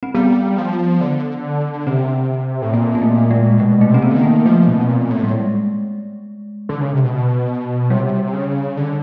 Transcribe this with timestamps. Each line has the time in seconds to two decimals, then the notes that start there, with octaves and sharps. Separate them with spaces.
0.03 C4
0.14 G3 B3
0.58 F3
1.01 D3
1.87 C3 C4
2.62 A2
2.73 A#2 A#3
2.95 A#3
3.02 A3
3.31 G#3
3.59 B2 G#3
3.81 A3
3.89 C3
3.94 C4
4.02 B3
4.11 D3
4.16 D#3
4.23 A#3
4.45 F3 A3
4.67 B2
4.88 A#2
5.10 A2
5.23 G3
5.31 G#3
6.69 D3
6.80 C#3
6.92 C3
7.04 B2
7.90 C3 G3
8.33 C#3
8.77 D3